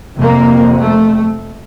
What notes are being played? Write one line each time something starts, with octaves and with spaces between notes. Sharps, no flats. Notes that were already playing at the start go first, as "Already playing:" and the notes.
F2 C3 A#3
A3